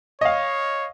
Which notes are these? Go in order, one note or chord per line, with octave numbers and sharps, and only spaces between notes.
C#5 D#5 F5